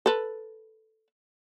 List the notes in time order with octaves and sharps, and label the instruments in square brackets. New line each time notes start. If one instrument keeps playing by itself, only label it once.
[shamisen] A4 B4